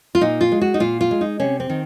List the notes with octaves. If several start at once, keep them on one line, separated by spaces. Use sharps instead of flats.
F4
A#2 D#4
F4
G#3
F#4
D#4
A#2 F4
F4
G#3
D#4
C3 C#4
C4
D#3